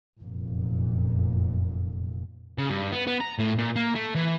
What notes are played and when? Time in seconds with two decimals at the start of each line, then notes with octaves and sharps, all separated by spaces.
0.21 F1 F#2 A#2
2.58 C#3
2.70 G2
2.92 B3
3.07 B3
3.21 A#5
3.39 A2
3.59 A#2
3.76 A#3
3.95 A3
4.15 E3